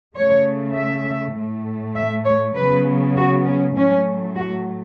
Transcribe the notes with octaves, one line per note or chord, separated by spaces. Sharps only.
C#3 A3 C#5
E5
A2 A3
E5
C#5
C#3 F#3 B3 B4
F#4
C#4
A2 F#3 A3 C#4
F#4